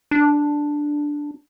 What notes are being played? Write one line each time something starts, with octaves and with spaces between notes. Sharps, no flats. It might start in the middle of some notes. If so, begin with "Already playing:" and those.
D4